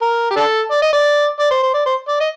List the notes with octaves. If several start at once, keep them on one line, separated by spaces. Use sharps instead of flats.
A#4
G4
D4 A4
D5
D#5
D5
D5
C5
C5
D5
C5
D5
D#5